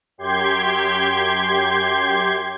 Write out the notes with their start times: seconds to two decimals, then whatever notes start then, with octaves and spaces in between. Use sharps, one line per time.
0.18 F#2 G4 C6 G6 G#6